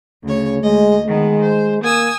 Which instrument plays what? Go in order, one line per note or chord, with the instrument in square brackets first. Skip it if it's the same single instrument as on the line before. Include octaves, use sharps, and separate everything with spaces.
[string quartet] D2 C#5 [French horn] C#3
[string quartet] D2 D#5 [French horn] G#3
[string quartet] D#3 B3 [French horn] G#3
[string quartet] C5
[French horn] A#3 [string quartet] G#5 D#6 E6